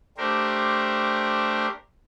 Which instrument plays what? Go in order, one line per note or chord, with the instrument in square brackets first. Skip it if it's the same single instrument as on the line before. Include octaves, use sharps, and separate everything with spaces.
[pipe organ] A3 D4 G4 A#4 C5